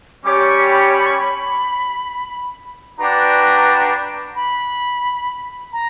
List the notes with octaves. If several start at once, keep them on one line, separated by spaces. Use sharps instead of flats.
G3 C#4 G4 C#5 D6
C#6
B5
B5
C#6
B5
D4 F#4 B4 D5 G5 A#5
B5
A#5